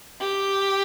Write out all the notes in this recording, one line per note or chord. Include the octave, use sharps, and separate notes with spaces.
G4